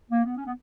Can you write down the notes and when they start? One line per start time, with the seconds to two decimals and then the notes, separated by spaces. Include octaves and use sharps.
0.11 A#3
0.25 B3
0.37 C#4
0.46 B3